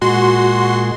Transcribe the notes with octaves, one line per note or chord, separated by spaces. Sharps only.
A#2 G#3 F#4 C6